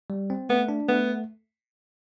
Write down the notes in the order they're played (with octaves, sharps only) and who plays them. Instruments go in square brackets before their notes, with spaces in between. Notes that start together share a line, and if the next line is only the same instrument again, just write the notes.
[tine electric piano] G3
C4
[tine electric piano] A3 [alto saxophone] B3
[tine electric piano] D4
[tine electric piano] A3 [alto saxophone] B3